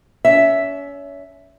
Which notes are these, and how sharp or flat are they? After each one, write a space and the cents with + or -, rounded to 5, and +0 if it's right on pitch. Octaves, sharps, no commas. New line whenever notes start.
C#4 +35 E5 +0